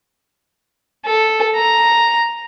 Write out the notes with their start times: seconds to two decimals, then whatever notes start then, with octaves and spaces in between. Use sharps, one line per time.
1.05 A4
1.56 A#5